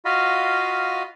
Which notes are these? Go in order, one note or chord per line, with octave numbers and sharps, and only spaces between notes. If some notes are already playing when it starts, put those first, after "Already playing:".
F4 F#4 D#5 F5 B5